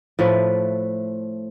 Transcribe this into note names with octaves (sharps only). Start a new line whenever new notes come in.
A2 F3 A3 B4